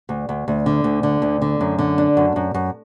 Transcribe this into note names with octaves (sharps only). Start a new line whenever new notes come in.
D2
D2
D2
D3
D2
D3
D2
D3
F#2
D3
D4
F#2
F#2
F#2